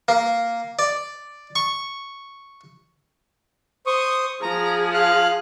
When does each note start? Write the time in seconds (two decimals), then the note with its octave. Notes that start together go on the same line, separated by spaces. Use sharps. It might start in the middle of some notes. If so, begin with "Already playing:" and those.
0.08 A#3
0.79 D5
1.56 C#6
3.86 C5 C#6 D#6
4.42 F3 G#4 A#5
4.94 F5 F#6